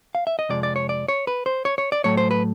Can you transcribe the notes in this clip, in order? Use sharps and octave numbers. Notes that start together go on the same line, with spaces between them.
F5
E5
D#5
F2 C3 F3 G#3 D5
D5
C#5
D5
C#5
B4
C5
C#5
C#5
D5
A2 F#3 A3 C#5
C5
B4